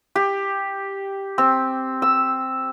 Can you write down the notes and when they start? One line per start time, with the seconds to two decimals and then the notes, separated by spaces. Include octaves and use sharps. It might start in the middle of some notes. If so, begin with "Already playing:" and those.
0.16 G4
1.38 C4
2.02 E6